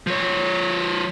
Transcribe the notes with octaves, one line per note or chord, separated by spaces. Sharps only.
F3 C#5